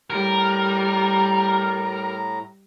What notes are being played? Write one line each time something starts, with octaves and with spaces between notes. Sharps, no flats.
A2 G3 A#4 A#5